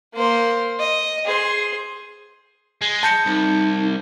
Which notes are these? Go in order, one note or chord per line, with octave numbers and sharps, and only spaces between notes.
A#3 C5
D#5
G#4 C5
G#3
A5 G6 C#7
C2 D#4